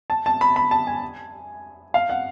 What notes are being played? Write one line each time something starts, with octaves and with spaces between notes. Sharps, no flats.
A5
A5
B5
B5
A5
G#5
F5
F#5